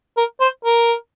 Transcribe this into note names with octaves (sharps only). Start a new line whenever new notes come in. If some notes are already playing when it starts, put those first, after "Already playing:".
A#4
C5
A#4